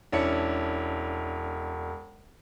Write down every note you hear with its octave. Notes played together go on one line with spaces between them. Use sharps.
E1 C#4 D4 E4 C#7